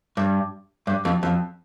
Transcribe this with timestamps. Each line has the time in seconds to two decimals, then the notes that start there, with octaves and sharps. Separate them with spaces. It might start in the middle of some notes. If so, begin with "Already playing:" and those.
0.17 G2
0.87 G2
1.05 F2
1.23 F2